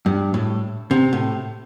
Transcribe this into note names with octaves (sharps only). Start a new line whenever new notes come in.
G2
A2
C3
A2